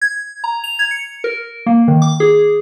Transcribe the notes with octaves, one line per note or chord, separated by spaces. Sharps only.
G#6
A#5
F7
G#6
C#7
A#4
A#3
D#3
D6
G#4